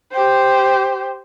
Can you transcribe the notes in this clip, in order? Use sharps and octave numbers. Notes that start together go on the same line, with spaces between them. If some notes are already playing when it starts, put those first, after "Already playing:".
G4 C5